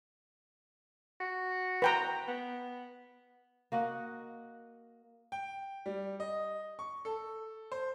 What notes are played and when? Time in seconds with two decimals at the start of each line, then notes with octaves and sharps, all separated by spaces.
1.20 F#4
1.82 B4 G5 A#5
2.28 B3
3.72 A#3 F#4 D#5 F#5
5.32 G5
5.86 G3
6.20 D#5
6.79 C#6
7.05 A4
7.72 C5